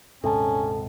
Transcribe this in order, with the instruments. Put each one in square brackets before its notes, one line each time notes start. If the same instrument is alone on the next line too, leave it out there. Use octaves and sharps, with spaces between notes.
[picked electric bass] D#1 G#2 C3 [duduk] C#4 [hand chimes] A4 A5